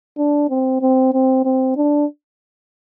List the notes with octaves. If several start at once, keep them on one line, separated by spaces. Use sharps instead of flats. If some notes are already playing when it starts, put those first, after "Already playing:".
D4
C4
C4
C4
C4
D4